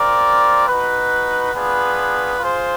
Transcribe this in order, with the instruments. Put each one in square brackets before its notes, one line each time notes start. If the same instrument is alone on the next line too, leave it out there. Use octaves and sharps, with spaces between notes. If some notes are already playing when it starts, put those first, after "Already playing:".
Already playing: [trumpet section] C4 F4 A#4 D5
D#4 F#4 B4
B3 D4 F4 G#4 B4
F4 G#4 C5